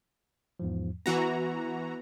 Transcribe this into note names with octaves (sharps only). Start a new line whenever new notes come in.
E2 G#2 F3
E3 B3 F#4 B4 A#5